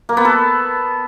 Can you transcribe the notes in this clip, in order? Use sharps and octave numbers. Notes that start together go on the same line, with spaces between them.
A#3
B3
A4